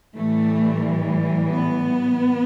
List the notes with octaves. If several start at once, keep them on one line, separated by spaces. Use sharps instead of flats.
A2 E3 G3 A3
B3